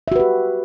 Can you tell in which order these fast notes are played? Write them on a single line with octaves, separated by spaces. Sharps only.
E5 F#4 B4 G4